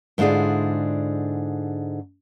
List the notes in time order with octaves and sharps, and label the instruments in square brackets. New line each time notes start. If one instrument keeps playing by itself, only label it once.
[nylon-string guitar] G#2 D3 E4 F4 G#4 D5